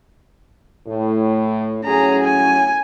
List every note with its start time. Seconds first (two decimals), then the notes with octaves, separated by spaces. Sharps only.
0.87 A2
1.85 A2 F#3 C#4 G#4 A#5
2.24 G#5